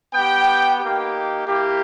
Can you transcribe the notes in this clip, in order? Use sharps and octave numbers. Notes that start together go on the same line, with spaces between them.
B3 G4 G5
A#3 D#4 G4
A#3 E4 G4